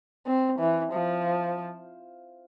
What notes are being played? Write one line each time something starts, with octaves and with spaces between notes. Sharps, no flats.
C4
E3
F3